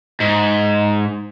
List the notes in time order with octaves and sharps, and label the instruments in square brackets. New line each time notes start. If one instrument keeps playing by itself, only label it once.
[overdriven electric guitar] G#2